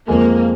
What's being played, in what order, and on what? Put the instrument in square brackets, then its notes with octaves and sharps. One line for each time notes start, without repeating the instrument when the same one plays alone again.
[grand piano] F2 F3 G#3 [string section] A#3